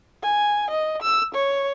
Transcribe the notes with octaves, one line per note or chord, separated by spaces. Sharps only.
G#5
D#5
E6
C#5